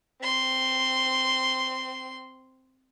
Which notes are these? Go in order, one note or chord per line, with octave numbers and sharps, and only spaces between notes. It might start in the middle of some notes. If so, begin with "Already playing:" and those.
C4 C6